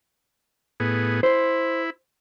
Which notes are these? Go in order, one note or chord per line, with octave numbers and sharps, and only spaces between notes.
A2 B3 G#4
E4 C5